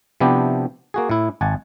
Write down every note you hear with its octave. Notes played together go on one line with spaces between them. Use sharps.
C3 F3 B3 D4 E4 G4
A#3 F#4 G#4
A2 E4
G#1 F#5 G#5 A5